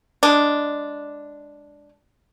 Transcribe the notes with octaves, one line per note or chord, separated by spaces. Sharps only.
G#3 D4